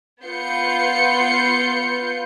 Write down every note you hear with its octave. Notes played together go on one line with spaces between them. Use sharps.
B3 F4 G6 C7 C#7